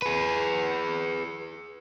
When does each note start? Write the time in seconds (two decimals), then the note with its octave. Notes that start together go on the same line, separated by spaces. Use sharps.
0.02 G#4 B4